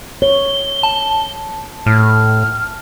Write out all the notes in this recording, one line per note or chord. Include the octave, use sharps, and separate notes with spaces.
C#5 G7
A5
A2 F6